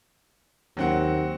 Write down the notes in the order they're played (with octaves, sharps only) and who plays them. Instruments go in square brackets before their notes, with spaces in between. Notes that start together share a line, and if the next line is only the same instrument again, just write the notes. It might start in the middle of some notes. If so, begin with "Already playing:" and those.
[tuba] D#2 [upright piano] F#3 C4 F#5